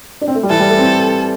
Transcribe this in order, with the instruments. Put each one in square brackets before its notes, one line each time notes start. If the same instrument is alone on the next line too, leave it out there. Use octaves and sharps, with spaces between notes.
[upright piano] D4
C4
A3
G3
[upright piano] E3 [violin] A4
[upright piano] G3
A3
C4